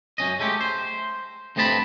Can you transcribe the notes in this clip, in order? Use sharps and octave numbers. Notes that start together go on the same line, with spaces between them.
F#2 C#4 D#5
G#3 A3 C#4 G4
C5
G2 A3 C4 D#5 A5 B5